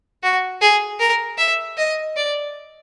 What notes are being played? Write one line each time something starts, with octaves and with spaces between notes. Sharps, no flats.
F#4
G#4
A#4
E5
D#5
D5